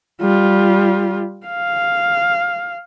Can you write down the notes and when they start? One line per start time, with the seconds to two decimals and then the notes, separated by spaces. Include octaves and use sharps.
0.22 G3 F4
1.47 F5